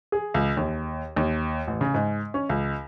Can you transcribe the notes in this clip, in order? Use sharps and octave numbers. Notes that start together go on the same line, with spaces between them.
G#4
C#2
D#2
D#2
A1
C#3
G#2
C#4
C#2